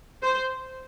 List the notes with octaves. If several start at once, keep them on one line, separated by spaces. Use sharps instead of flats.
C5